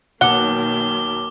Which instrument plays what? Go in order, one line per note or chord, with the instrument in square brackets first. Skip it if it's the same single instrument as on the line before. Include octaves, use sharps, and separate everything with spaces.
[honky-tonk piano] B1 [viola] D#3 A#3 [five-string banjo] F#5 [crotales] D6 G7